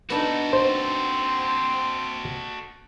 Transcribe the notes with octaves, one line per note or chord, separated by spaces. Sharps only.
B3 D4 D#4 F#4 A4
C4 C5